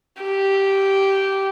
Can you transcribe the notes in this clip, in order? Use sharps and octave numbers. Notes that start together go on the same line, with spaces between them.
G4